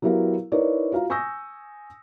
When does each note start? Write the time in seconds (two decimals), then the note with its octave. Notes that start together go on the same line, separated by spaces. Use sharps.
0.02 F#3 B3 E4 G4 A#4 F5
0.52 D#4 E4 A#4 B4 C#5 D5
0.92 F4 F#4 F5 A#5
1.10 G#5 C#6 D#6 E6 G6 A#6